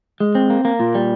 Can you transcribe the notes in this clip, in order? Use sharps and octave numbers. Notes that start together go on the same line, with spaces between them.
G#3
C4
A#3
A#3
A#2
G3